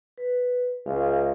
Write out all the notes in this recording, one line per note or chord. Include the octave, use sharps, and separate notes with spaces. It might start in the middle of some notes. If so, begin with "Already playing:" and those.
B4
C#2 G#4 E5 F5